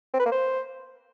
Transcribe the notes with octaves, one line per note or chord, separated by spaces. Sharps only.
C4
B4
A#3
C5